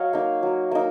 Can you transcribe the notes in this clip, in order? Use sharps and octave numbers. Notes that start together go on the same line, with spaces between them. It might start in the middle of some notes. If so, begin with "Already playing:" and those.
Already playing: F#3 C#5 D#5 F5
A#3 D#4
F#3
A#3 D#4